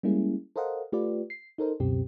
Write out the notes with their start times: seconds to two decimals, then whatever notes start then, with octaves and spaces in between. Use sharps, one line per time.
0.03 G3 G#3 A#3 C#4 E4 G#4
0.56 A4 A#4 C5 D#5 F5 F#5
0.92 A3 F4 G4 B4 D5
1.30 C7
1.58 D#4 A4 A#4 C5
1.80 C#2 F#2 B2 C4 G4